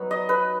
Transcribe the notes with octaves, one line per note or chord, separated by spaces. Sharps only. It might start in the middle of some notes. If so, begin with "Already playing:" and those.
Already playing: F#3 B3 D#4 B4
D#5
B4